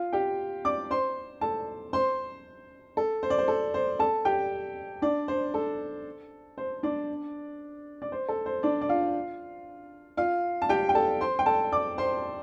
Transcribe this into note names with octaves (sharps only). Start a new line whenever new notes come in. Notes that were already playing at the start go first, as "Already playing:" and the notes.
Already playing: F4 F5
G4 G5
D5 D6
C5 C6
A4 A5
C5 C6
A4
C5
D5
C5
A4
C5
A4 A5
G4 G5
D4 D5
C5
A4
C5
D4 D5
D5
C5
A4
C5
D4 D5
D5
F4 F5
F4 F5
A5
G4 G5
G5
A4 A5
C5 C6
G5
A4 A5
D5 D6
C5 C6